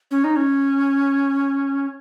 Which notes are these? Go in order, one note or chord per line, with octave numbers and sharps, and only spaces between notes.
C#4
D#4
C#4